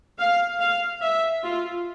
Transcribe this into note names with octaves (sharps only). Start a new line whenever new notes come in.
F5
F5
E5
F4